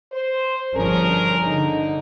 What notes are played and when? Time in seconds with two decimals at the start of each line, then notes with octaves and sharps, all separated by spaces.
0.12 C5
0.75 G1 F3 C#4 D4 G#4 A#4
1.46 D3 D#4